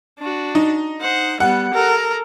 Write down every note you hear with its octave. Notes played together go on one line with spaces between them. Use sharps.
D4 F#4
D#4
C5 F#5
G3 B3 F#5
A4 A#4